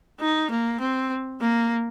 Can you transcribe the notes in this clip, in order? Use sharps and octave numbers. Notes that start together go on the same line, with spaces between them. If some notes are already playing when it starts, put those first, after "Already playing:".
D#4
A#3
C4
A#3